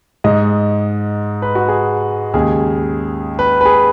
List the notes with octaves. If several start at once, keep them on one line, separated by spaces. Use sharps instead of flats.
G#2 G#3 D#5
B4
F#4
G#4
D#2 C#3 G#3 G#4
B4
B4
G#4